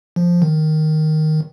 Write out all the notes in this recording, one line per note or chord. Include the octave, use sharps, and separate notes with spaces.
F3
D#3